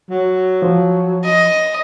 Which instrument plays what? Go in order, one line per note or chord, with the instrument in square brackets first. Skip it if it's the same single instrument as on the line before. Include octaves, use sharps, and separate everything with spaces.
[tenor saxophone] F#3
[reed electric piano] F3
[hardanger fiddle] D#5